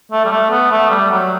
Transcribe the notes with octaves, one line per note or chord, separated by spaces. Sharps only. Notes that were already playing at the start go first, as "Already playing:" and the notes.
A3
G3
A3
B3
A3
G3
F#3